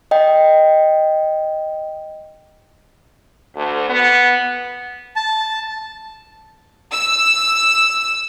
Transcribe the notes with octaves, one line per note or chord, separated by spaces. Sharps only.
D#5 G5
D2
B3
A5
E6